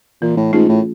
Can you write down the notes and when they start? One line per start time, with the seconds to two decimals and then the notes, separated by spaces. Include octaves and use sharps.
0.22 A#2 E3
0.37 A2
0.53 G#2 A3 C#4 F4 G#4
0.69 A2